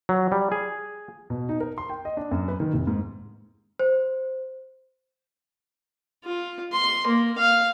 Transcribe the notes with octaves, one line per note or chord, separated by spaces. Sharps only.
F#3
G3
G#4
B2
D#4
A#4
C6
G5
D#5
D4
F#2
B4
D#3
F1
G#2
C5
F4
C6
A#3
F5